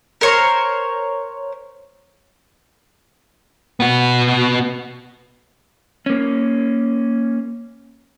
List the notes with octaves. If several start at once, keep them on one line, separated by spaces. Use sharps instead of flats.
A#4 C5 C#5 C6
B3 F#4
A#3 C#4